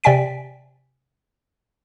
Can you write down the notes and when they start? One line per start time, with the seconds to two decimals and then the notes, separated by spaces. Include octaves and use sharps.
0.04 C3 D5 G5 G#5 B6 D7